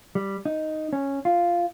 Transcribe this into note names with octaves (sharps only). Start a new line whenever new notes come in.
G3
D#4
C#4
F4